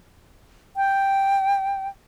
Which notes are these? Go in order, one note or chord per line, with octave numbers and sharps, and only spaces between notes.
G5